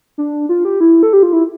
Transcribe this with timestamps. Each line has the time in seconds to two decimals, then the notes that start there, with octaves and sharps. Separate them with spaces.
0.18 D4
0.49 F4
0.65 G4
0.80 E4
1.03 A4
1.13 G4
1.23 F4
1.33 E4